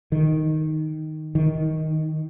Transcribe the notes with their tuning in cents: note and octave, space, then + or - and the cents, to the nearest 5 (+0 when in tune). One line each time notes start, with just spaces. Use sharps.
D#3 +0
D#3 +10